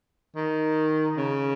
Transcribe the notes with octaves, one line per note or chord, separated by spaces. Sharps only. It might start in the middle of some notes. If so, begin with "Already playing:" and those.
D#3
C#3